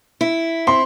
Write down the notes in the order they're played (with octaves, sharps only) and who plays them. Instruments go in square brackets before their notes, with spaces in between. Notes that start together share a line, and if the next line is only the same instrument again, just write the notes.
[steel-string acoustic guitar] E4
[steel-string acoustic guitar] C4 [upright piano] C6